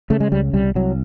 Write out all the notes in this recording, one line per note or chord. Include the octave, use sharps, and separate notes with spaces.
C#3 A3
G#3
C#2 G3
C2 G3
C2 F#3